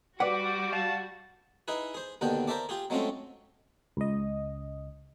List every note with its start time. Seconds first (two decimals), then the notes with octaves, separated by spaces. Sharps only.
0.20 G3 F#4 B4 D5 F#5 D6
0.73 F5 A5
1.68 D#4 E4 G#4 B4
1.94 G#4 C5
2.21 D#2 B2 D3 D4 G5
2.47 A#4 C5 D5 E5 A5 D6
2.69 F4 G4 G#4
2.90 F#3 G#3 A3 C4 C#4 F4
3.97 C#2 D#5